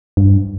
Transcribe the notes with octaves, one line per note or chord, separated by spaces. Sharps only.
G2